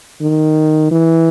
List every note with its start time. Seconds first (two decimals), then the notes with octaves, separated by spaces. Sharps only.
0.21 D#3
0.91 E3